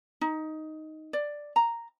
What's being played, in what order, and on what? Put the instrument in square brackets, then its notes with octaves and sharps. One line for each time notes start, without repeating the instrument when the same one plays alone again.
[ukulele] D#4
D5
A#5